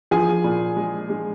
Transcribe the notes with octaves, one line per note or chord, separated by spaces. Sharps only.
F3 G#4 G#5
A#2
G#3
G#3